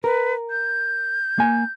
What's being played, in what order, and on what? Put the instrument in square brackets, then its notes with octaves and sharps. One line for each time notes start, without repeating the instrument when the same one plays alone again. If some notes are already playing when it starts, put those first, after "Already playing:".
[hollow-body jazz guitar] A#4 [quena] B4
[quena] G6
[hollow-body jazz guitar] A#3 G#5